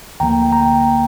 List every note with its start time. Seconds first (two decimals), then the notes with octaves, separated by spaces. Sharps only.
0.20 D2 D3 F3 A#3 G5 A#5
0.52 G5 A#5